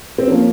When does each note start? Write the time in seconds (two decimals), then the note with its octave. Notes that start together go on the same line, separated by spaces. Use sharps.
0.18 C4
0.28 F3 A#3 C#4